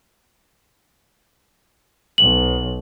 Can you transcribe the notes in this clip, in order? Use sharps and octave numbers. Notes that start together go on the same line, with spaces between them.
B1 F#7